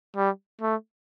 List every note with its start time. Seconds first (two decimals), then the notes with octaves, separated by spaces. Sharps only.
0.17 G3
0.62 A3